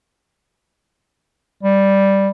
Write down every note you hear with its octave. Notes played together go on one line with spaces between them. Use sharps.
G3